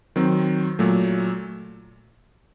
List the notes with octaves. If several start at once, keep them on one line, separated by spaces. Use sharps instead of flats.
D#3 F#3 C4
A#2 F#3 A3